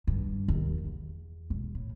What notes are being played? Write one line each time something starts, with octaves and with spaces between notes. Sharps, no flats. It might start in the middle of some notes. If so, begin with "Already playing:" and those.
G2
D#2
E2
E1
A2